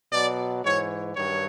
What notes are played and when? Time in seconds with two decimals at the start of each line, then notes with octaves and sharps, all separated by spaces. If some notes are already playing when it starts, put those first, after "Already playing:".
0.13 B2 F#3 D5
0.65 G#2 E3 C#5
1.15 G2 D#3 F#3 C#5